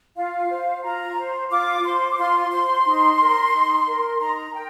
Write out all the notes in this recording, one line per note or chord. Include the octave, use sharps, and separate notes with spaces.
F4 F5
C5
F4 A#5
C5
F4 D6
C5 C6
D6
F4 C6
C5 C6
D#4
A#4
D#4
A#4
D#4 A#5
A#4 G5